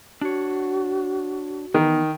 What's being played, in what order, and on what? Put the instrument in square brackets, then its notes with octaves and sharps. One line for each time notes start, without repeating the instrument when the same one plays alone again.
[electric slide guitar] D4 C#5 [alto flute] F#4
[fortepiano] D#3 [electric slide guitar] E3 B3 D#4